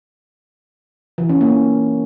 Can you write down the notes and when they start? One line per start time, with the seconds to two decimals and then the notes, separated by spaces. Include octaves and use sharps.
1.18 E3
1.29 C#4
1.41 A#3